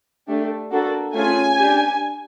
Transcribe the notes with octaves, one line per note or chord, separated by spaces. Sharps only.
A3 D4 G4
A#3 D4 F#4 A4
A3 C#4 F4 G#4 G#5
D4 G4